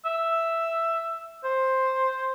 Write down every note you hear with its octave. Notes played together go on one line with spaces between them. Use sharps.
E5
C5